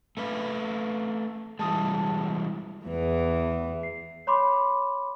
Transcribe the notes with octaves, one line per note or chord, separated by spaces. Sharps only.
A3 B4 F5
E3 G3 G#3 A5 D#6
E2 E3
C7
C#5 B5 C6 D6